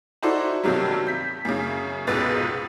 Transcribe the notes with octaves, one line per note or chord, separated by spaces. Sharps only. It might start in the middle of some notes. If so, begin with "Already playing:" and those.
D#4 E4 F#4 A4 C5 D5
G2 C3 D#3 F#3 G3
G6 B6
F#2 C#3
F1 C#2 G#2 B2 B4 A6